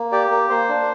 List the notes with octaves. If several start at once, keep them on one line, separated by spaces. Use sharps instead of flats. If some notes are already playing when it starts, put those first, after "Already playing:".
Already playing: A#3
G4 D5
A#3
A#3 C5
D4